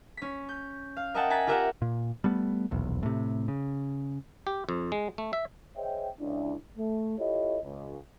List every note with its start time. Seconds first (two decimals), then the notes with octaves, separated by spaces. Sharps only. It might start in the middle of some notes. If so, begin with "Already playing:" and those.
0.17 C#4 B6
0.49 G6
0.97 F5
1.14 A#4 D#5 E5 F#5 G5 A5
1.30 G#5 A#5 F#6 A6 B6
1.47 F4 G4 A#4 E5 F#5
1.82 A#2
2.24 G3 A3 B3
2.71 D#1 B1 E2
3.03 A2 C3
3.48 C#3
4.47 G4
4.69 F2
4.92 G#3
5.18 A3
5.33 E5
5.77 G#4 C5 C#5 D#5 E5 G5
6.20 C#2 D4 E4
6.77 A3
7.19 E4 F4 G4 A4 C#5 D#5
7.64 C#2